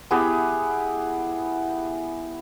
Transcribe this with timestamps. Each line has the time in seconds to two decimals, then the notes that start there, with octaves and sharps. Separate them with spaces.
0.11 B3 E4 G4 G#4